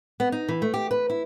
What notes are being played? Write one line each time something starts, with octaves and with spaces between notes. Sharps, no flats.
B3
D#4
E3
A3
G4
B4
E4